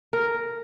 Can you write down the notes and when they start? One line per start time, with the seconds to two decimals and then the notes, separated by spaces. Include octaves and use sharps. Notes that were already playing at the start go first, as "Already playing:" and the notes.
0.13 A#4